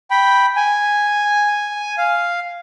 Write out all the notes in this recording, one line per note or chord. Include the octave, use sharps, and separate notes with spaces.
G5 B5
G#5
F5